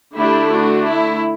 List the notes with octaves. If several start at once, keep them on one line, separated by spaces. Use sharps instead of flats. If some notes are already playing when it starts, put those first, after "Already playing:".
D3 A3 D4 E4 G4
D4 F#4
E4